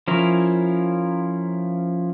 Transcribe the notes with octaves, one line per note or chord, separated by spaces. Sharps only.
F3 C#4 E4 A#4